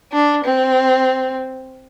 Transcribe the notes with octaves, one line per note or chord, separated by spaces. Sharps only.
D4
C4